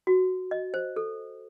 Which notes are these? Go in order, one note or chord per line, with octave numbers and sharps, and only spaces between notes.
F#4
D#5
C5
A4